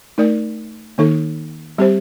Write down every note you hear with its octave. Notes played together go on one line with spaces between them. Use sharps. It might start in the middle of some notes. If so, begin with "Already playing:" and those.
A3 D#4 A#4 D5
D#3 A#3 D#4 A4
G3 C4 G4 C5